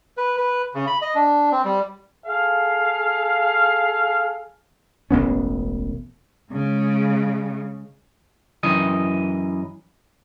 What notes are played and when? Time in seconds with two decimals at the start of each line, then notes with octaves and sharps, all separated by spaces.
0.17 B4
0.37 B4
0.74 C#3
0.87 B5
1.02 D#5
1.15 D4
1.52 C4
1.65 G3
2.26 G#4 A4 F5
5.11 E1 A1 B3 C#4
6.52 C#3 G#3
8.63 F#2 E3 D#5